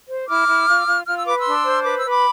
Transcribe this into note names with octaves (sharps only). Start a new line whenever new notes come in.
C5
E4 D6 F6
E4
F4
F4
F4 F6
E6
B4 D6
C6 E6
D4
C5
B4 D6
E6
B4
B5 D6